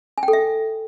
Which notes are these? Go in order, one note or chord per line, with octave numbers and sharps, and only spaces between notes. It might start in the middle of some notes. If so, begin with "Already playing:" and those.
G#5
G5
A4
E5